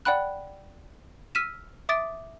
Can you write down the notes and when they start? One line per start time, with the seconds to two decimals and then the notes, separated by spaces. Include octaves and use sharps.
0.05 D5 F#5 G5 B5 F#6
1.35 E6 F6 B6 D#7 E7
1.89 E5 D6 D#6 A6 D7